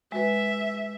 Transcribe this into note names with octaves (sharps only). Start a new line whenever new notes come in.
G#3 F#4 B4 E5